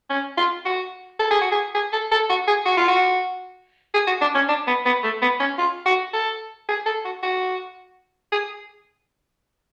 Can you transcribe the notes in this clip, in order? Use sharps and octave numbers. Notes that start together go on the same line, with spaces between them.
C#4
F4
F#4
A4
G#4
F#4
G#4
G#4
A4
A4
F#4
G#4
F#4
F4
F#4
G#4
F#4
D4
C#4
D4
B3
B3
A3
B3
C#4
F4
F#4
A4
G#4
A4
F#4
F#4
G#4